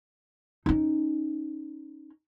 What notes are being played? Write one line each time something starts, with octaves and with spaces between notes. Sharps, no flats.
C#4 D#4